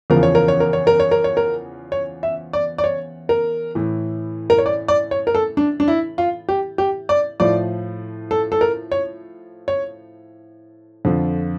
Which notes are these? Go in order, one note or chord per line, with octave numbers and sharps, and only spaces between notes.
E2 C#3 F3 A#4
C#5
A#4
C#5
A#4
C#5
A#4
C#5
A#4
C#5
A#4
C#5
E5
D5
D5
C#5
A#4
A2 E3
A#4
C#5
D5
D5
C#5
A#4
A4
D4
D4
E4
F4
G4
G4
D5
A2 F3 D5
A4
A4
A#4
C#5
C#5
F2 D3 F3